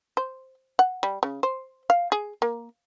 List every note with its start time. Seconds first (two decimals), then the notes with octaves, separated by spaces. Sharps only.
0.17 C5
0.79 F#5
1.03 G3
1.23 C#3
1.43 C5
1.90 F5
2.12 G#4
2.42 A#3